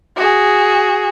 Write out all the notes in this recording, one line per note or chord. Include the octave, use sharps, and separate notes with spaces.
F#4 G#4